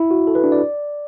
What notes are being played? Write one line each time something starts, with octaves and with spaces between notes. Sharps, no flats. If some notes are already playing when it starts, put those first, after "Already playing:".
Already playing: E4
F#4
A4
B4
D4
D5